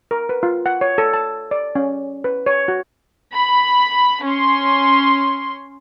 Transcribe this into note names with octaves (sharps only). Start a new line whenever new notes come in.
A#4
B4
F4
F#5
C#5
A4
A5
D5
C#4
B4
C#5
F#4
B5
C#4 C6